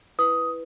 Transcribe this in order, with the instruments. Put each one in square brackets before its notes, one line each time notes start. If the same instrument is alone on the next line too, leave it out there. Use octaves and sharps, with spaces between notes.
[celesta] E4 B4 D#6